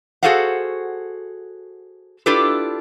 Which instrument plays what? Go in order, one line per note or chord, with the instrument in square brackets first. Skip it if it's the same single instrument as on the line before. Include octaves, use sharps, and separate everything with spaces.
[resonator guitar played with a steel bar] F#4 G#4 A4 C5 F5 F#5
D4 E4 F4 G4 A4 B4